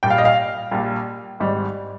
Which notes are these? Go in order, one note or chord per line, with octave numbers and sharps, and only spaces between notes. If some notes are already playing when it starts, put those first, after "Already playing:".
A#1 A#2 G3 G5
F5
D#5
F5
A#1 A#2 G3
G#1 G#2 G3